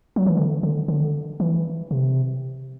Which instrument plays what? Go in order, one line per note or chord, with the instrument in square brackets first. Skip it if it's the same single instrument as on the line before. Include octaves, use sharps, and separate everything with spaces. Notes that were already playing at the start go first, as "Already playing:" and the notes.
[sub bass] F#3
E3
D3
D3
D3
E3
C3